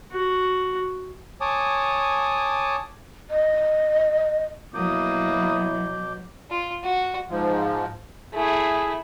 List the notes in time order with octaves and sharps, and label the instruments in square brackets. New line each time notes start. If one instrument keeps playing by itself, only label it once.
[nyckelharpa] F#4
[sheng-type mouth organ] C#5 G#5 A5 D6 D#6
[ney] D#5
[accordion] B2 D6 G6 [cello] F#3 [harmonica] A#3 D#6 [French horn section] B3 E4
[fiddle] F4
F#4
[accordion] G#2 F3
[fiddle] A3 E4 [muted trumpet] G#4